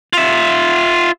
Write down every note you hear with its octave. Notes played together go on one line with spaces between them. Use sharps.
F4 E5